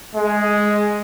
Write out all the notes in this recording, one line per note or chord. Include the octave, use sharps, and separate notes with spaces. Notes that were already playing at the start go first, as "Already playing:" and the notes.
G#3